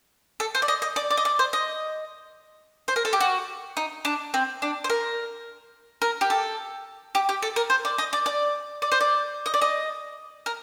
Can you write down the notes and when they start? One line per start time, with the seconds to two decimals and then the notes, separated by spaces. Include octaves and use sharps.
0.40 A4
0.55 C5
0.62 D5
0.68 D#5
0.82 D#5
0.96 D5
1.11 D5
1.17 D#5
1.25 D5
1.39 C5
1.53 D#5
2.88 C5
2.96 A#4
3.05 A4
3.13 G4
3.20 F#4
3.77 D#4
4.05 D4
4.34 C4
4.62 D4
4.84 C5
4.90 A#4
6.02 A#4
6.21 G4
6.30 A4
7.15 G4
7.29 G4
7.42 A4
7.56 A#4
7.70 C5
7.85 D5
7.98 D#5
8.13 D5
8.26 D5
8.82 D5
8.92 C5
9.01 D5
9.46 D#5
9.54 D5
9.61 D#5
10.46 A#4